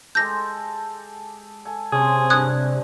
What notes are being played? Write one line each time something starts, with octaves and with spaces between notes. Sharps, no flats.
G#3 G4 A4 G6 A#6
A4 G#5
C3 C#4 G#4 C5
G2 D3 D#6 F#6 G#6